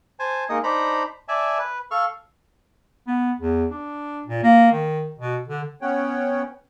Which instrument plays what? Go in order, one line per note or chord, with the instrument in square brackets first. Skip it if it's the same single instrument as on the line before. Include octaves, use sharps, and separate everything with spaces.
[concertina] C5 G#5 A5
G#3 A#3 D#4 D#5
D4 D#4 C5 A#5 B5
D5 E5 G#5 A5
B4
A4 F5 C#6 F6
[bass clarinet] B3
E2
D4
A#2
A#3
D#3
B2
D3
[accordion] B3 C#4 C#5 F#5 G5